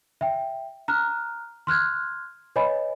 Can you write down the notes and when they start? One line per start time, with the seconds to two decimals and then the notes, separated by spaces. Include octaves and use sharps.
0.21 E5 G5
0.88 A#5 F6 F#6
1.67 C6 F6 F#6 G#6
2.56 B4 C#5 D#5 G#5 B5